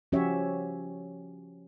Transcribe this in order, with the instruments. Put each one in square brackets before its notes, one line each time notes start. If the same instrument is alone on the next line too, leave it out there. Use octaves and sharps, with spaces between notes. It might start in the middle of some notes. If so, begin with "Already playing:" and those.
[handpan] F3 C#4 F#4 G4 C#5 E5